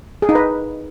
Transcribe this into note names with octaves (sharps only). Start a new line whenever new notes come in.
G#4
D#4
B4